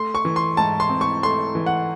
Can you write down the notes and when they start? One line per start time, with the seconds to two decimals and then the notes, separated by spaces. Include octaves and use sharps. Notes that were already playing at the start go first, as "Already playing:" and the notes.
Already playing: A3 C6
0.15 C#6
0.25 E3
0.36 C6
0.57 G#2 A5
0.80 C6
0.90 C4
1.01 C#6
1.23 A3 C6
1.55 E3
1.66 F#5